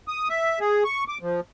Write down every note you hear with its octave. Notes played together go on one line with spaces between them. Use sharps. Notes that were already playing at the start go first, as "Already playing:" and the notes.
D#6
E5
G#4
C#6
D6
F3